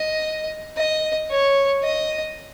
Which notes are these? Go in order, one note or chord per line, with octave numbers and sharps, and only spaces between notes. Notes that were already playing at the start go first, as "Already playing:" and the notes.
Already playing: D#5
D#5
C#5
D#5